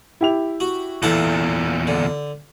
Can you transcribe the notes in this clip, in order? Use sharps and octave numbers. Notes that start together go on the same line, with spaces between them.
E4 G4 F7
F#4
E2 A#2 E3 A4 E5 F#5
D3